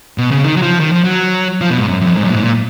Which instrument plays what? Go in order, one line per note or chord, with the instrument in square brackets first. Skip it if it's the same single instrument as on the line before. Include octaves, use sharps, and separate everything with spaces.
[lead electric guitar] B2
C#3
D#3
F#3
F3
D#3
F3
F#3
F3
B2
G#2
F#2
F#2
F2
G#2
F#2
A#2
G#2
A#2